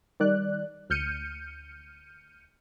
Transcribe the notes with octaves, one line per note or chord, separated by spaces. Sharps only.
D#3 G3 D5 F#6
D2 F6 G6 C#7 D#7